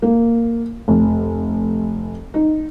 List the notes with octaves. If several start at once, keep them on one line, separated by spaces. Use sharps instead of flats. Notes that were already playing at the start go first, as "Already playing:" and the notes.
A#3
F1
D#4